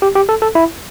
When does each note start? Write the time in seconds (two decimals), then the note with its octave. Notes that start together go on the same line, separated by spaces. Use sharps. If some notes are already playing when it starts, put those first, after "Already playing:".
0.02 G4
0.15 G4
0.29 A4
0.42 A4
0.55 E4